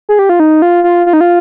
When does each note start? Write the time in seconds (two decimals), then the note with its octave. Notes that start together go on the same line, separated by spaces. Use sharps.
0.09 G#4
0.19 G4
0.29 F4
0.40 D#4
0.62 F4
0.84 F4
1.06 F4
1.13 D#4
1.21 F4